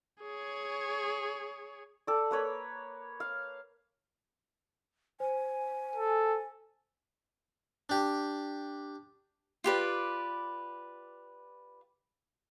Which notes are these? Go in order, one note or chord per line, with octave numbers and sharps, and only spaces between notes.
G#4 C#5
A4 D5
A#3 B4 C#5 B5
F5
C5 G#5
A4
D4 G4
F4 G4 B4 D5